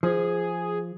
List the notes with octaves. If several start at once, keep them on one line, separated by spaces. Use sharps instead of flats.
F3 G#4